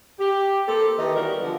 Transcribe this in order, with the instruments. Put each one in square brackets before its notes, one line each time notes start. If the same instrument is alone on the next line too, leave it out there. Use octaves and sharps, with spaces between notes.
[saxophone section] G4
A#3 C4 G4 A4
D#3 E3 D#4 G4 D#5
E3 G3 B3 F#4 A#4
D3 F3